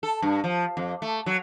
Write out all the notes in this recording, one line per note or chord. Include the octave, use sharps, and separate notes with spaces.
A4
G2
F3
F2
A3
F#3